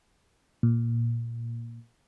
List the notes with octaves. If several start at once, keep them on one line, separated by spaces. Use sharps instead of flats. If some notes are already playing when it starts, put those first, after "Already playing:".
A#2